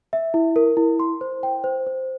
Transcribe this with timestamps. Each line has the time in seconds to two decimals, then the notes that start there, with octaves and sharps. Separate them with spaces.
0.13 E5
0.34 E4
0.56 A#4
0.77 E4
1.00 C6
1.21 C5
1.43 G5
1.64 C5
1.87 C5